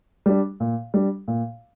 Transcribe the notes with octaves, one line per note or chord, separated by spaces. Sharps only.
G3 D4
A#2
G3 D4
A#2